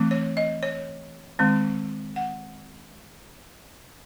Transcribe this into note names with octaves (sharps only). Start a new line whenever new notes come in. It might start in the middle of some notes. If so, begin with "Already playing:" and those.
Already playing: E3 A3 C4
C#5
D#5
C#5
D#3 G#3 C4
F#5